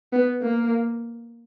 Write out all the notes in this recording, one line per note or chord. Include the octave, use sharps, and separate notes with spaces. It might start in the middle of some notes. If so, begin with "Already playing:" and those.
B3
A#3